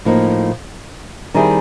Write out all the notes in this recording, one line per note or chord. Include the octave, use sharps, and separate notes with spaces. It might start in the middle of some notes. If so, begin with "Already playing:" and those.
A2 F3 A#3 D#4
D#3 G3 C4 E4 G#4